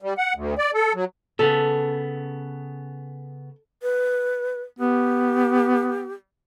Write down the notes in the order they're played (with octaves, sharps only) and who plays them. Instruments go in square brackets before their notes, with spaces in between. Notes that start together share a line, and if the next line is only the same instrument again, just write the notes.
[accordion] G3
F#5
D2
D5
A4
F#3
[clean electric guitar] C#3 B3 [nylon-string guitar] A4
[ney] B4
[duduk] B3 [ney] G4